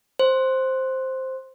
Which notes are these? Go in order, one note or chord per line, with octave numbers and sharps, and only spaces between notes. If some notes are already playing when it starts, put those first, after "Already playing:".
C5